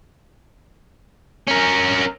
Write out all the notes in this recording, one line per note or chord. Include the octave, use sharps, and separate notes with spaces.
C#4 A#4